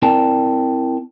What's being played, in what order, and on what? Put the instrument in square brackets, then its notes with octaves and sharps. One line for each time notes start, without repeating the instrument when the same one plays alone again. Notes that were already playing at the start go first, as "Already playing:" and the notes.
[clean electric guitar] C4 E4 A#4 D5 G5 A5